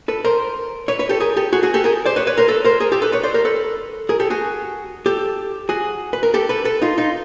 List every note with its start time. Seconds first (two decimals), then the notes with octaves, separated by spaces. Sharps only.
0.08 A4 B4
0.25 A#4 C5
0.88 B4 C#5
0.99 B4 C#5
1.09 G4 A4
1.20 G#4 A#4
1.37 G4 A4
1.53 F#4 G#4
1.63 F#4 G#4
1.74 G4 A4
1.84 G#4 A#4
2.06 C5 D5
2.16 B4 C#5
2.27 B4 C#5
2.38 A#4 C5
2.49 A4 B4
2.65 A#4 C5
2.80 G#4 A#4
2.92 G4 A4
3.02 A4 B4
3.12 B4 C#5
3.23 C5 D5
3.34 A#4 C5
3.45 A4 B4
4.09 G#4 A#4
4.20 G4 A4
4.30 F#4 G#4
5.06 G4 A4
5.69 F#4 G#4
6.13 B4
6.23 A#4
6.34 G4 A4
6.49 A4 B4
6.65 A4 B4
6.82 D#4 F4
6.98 D#4 F4